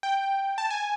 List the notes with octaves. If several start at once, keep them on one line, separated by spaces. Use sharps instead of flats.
G5
A5
G#5